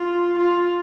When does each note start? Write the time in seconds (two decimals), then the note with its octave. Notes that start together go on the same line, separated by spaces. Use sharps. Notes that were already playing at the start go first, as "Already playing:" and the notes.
Already playing: F4
0.38 F4